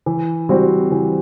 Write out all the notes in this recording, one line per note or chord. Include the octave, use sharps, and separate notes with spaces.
E3
G3 C4 F#4 C5
E3